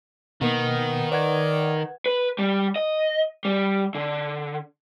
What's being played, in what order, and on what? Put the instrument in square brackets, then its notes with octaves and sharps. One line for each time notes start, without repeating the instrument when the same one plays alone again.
[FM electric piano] B2 A#3 [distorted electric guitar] D#3 [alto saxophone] B3
[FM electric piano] B4 F#5 G#6 [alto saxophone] D5
[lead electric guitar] B4
G3
D#5
G3
D3